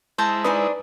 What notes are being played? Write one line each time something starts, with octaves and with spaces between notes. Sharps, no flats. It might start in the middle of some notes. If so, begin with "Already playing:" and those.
G#3 E4 C5 A5 A#5
D4 D#4 B4 G#5 D#6